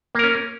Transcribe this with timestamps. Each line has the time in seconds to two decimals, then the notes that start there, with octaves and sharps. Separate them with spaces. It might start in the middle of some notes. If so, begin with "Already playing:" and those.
0.15 A#3
0.19 A#4
0.24 C#4